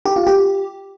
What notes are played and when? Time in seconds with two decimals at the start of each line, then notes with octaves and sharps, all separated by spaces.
0.06 G4
0.16 F4
0.27 G4